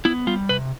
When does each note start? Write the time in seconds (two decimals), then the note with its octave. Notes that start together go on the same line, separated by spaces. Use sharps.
0.05 B3 E4
0.27 G3 F4
0.49 C3 B4